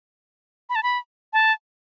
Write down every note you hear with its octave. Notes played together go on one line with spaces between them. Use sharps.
B5
A5
B5
A5